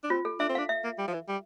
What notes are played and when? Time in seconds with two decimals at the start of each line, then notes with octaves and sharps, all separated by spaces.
0.03 D4
0.10 C4 F4
0.25 A4
0.40 D4 E5
0.49 C4
0.55 D4 F5
0.69 E5
0.84 A#3
0.98 G3
1.08 F3
1.13 E3
1.28 G3